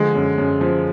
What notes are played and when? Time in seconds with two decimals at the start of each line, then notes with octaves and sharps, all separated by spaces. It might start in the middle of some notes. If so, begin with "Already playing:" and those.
Already playing: D3 F3 G#3
0.15 F#2
0.38 F#2
0.61 F3